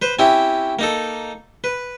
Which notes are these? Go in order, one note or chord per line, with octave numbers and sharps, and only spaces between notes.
B4 C5
C4 C#4 E4 G4
A#3 D#4 A4
B4